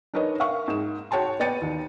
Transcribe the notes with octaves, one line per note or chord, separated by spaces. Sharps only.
D4 D#4 A#4 B4 C#5 D#5
A#4 E5 F5 C#6
G#2 E7
F#4 C#5 G5 A5 C6
B3 D5 G5 A6 C#7 D#7
D#2